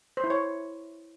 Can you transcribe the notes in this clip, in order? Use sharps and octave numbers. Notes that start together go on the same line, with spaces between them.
C5
E4
C#5